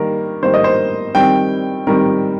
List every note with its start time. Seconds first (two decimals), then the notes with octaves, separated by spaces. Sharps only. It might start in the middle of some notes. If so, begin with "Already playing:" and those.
Already playing: D#3 G3 A#3 A#4
0.43 D#3 G3 A#3 C5
0.54 D#5
0.64 C5
1.15 D#3 G3 C4 G5
1.87 D#3 G3 C4 A#4